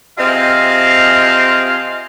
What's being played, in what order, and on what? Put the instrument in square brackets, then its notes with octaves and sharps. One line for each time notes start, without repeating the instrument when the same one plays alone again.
[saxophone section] C3 C4 F4 G#4 D#5 F5